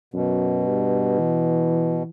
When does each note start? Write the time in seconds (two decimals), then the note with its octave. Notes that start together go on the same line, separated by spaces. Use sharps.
0.14 F#2 B2
0.67 G2
1.19 E3